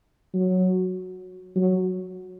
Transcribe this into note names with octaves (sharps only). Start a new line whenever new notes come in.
F#3
F#3